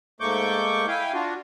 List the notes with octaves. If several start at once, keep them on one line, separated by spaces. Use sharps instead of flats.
G#2 A3 A#3 C#6 D6 G6
E4 F5 G5 G#5
D4 F4 F#4